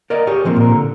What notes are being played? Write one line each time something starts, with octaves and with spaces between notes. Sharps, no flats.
A#4 D5 D#5
G4 G#4 C#5
E3 F3 A#3 C4
A#2 A#4
D3